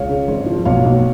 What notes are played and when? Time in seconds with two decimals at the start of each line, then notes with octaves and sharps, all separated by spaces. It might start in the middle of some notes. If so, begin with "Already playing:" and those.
Already playing: C#2 C#5 F5
0.09 C#3
0.28 G#1
0.46 F3
0.65 B1 C#5 F5
0.85 B1